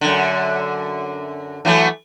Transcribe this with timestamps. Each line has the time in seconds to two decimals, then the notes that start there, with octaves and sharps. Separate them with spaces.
0.01 F#2 D3
1.65 E3 F#3 A3